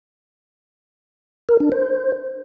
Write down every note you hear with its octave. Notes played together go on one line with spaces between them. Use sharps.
A#4
D4
C5